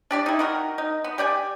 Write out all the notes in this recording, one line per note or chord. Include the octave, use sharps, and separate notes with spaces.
D4 G4 D5
D#4 E4
D#3 F#4 A#4
D#4
B3
G4 D5 G5 G#5